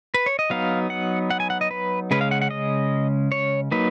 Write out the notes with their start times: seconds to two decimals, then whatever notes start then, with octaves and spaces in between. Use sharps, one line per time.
0.14 B4
0.26 C#5
0.39 D#5
0.50 F#3 B3 D#4 F5
0.90 F#5
1.31 F#5
1.40 G#5
1.50 F#5
1.61 D#5
1.71 B4
2.11 C#3 G#3 C#4 B4
2.21 F5
2.31 F#5
2.42 F#5
2.51 D#5
3.32 C#5
3.72 F#3 A#3 D#4 B4